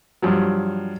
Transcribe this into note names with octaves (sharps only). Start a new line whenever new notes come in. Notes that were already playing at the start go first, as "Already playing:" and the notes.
G2 F3 F#3